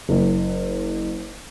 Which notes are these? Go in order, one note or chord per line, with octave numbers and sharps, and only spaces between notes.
F#1